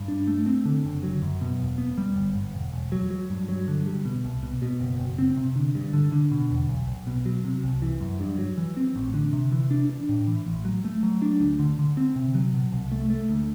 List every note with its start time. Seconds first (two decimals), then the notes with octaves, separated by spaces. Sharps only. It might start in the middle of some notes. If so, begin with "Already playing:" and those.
Already playing: G2
0.08 D4
0.27 A3
0.46 C4
0.65 D3
0.84 F#1
1.03 F#3
1.22 F#2
1.41 B2
1.59 E1
1.78 B3
1.98 G3
2.16 G1
2.36 G1
2.54 E1
2.73 E1
2.92 F#3
3.10 F#3
3.30 G2
3.49 F#3
3.68 D3
3.86 G3
4.05 B2
4.24 C2
4.43 B2
4.62 B2
4.80 F#1
4.99 F#1
5.18 C4
5.37 C3
5.56 D3
5.75 G2
5.93 D3
6.12 D3
6.31 B2
6.51 E2
6.69 B1
6.87 B1
7.07 B2
7.26 F#3
7.44 C3
7.64 C2
7.82 E3
8.01 F#2
8.20 G2
8.39 F#3
8.57 E3
8.77 C4
8.96 A1
9.14 D3
9.33 C3
9.52 E3
9.71 D4
9.90 D4
10.09 A2
10.27 E3
10.46 A1
10.65 F#3
10.85 A3
11.03 F#3
11.22 D4
11.40 D2
11.59 D3
11.79 D3
11.97 C4
12.16 C3
12.35 F#3
12.54 B2
12.73 C2
12.92 A3
13.10 A3
13.29 D2